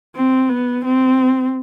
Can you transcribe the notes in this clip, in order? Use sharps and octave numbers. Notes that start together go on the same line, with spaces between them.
C4
B3
C4